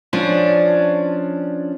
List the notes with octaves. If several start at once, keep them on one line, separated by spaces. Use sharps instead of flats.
F3 C#4 D4